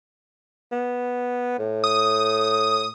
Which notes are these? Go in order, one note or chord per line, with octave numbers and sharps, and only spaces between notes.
B3
A2
D#6